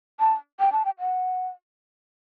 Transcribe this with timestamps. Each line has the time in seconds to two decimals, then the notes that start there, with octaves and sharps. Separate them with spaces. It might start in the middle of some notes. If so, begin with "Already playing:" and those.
0.20 A5
0.60 G5
0.72 A5
0.85 G5
1.00 F#5